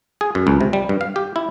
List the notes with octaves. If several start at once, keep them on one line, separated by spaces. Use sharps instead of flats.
G#4
F#2
C#2
C3
G3
G2
F5
G4
E4